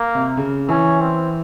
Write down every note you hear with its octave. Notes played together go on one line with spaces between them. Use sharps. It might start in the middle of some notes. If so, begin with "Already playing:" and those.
Already playing: A#3
C3
C#3
E3 C#4
C4